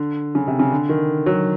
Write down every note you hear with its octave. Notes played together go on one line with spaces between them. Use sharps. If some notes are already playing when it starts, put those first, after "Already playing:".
Already playing: D3
C#3
C3
C#3
D3
D#3
F#3